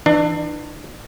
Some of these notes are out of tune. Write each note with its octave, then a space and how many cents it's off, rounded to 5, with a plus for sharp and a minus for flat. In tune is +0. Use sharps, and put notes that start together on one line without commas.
E3 -5 D4 +35